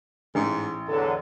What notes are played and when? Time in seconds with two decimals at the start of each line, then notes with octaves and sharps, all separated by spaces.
0.35 A1 G#2
0.88 E2 D3 F#3 A4